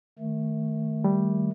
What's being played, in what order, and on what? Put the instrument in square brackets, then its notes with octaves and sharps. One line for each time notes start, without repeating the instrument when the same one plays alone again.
[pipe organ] D#3 A3
[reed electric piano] G3